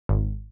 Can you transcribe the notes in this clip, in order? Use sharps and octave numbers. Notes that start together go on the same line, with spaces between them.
G#1